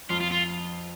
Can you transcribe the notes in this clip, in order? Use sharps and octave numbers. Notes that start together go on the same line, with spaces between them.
F2 F4
F4
F4